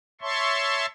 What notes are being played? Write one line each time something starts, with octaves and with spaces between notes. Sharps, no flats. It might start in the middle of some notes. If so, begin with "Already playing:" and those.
C#5 E5 A5 C6 C#6